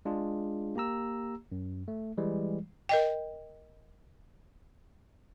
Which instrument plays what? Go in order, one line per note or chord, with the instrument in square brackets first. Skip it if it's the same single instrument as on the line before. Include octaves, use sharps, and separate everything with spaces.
[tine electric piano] G#3 D4 F4 G#4
A#3 G4 A#5 E6
F#2
A3
E3 G3 G#3
[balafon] A#4 D#5 G5